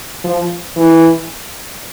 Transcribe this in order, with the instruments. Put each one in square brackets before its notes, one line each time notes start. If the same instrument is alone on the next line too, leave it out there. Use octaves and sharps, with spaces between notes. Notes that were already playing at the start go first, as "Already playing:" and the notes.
[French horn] F3
E3